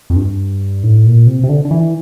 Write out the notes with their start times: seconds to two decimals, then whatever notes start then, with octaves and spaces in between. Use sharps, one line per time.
0.10 F2
0.16 G2
0.83 A2
1.06 A#2
1.27 C3
1.43 C3
1.49 D3
1.65 D3
1.71 E3